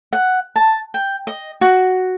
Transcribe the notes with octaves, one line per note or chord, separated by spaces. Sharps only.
F#5
A5
G5
D#5
F#4